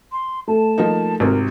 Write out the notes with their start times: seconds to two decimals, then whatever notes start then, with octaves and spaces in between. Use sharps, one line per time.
0.12 C6
0.48 A3 A5
0.78 F3 A#3 D#4
1.20 G#1 C3 A#4